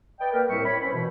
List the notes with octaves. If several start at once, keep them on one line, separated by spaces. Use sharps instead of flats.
B4 D5 D#5 G5
A#3 A#4 B4
C2 A2 G3 C4 E5 C#6
C#5 B5
E3 C#4 C5 B5
B2 E3